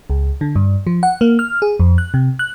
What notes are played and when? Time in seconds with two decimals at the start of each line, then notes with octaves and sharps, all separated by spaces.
0.10 C#2
0.41 D3
0.55 G2
0.87 F3
1.03 F#5
1.21 A#3
1.39 F6
1.62 G#4
1.80 F2
1.98 F#6
2.14 C3
2.39 F#6